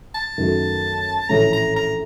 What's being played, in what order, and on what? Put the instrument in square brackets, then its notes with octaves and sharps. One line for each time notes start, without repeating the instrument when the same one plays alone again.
[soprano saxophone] A5
[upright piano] F#2 D#3 F#3 A3
[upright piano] A#1 A2 E3 A3 C#4 [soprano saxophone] A#5
[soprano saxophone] A#5
A#5